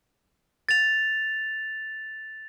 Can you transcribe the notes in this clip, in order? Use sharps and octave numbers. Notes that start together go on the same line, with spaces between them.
A6 F7